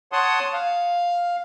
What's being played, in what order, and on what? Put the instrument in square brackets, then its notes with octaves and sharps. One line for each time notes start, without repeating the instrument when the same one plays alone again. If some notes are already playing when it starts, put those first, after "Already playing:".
[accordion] C#5 F#5 A5 C6 D#6
F5